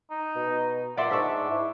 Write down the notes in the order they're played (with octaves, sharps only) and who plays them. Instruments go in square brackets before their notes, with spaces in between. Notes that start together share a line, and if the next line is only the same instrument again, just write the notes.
[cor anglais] D#4
[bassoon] B2
[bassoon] A#2 [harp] D5 E5 C6 [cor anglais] F#5
[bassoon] G#2 [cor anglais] D4 [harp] C#6 E6 B6
[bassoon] E4